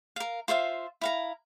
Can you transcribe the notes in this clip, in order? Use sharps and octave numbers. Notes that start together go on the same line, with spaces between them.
A#4 F5
F4 C5 E5 F5
E4 F5 A#5